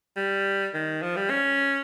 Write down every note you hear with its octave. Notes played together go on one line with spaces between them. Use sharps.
G3
D#3
F3
G3
C#4